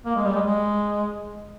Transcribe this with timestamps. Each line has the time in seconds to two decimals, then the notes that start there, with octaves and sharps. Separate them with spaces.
0.06 A#3
0.16 G#3
0.25 G3
0.35 G#3
0.46 G#3